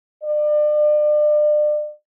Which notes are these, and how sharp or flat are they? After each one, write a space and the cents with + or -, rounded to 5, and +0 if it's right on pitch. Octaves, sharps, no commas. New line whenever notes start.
D5 +35